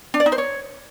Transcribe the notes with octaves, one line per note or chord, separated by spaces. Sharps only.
D4
D5
D#4
C5
C#5